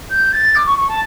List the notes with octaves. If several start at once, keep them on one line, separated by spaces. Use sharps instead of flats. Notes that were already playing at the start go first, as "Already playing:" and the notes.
G6
A6
D6
C#6
C#6
A5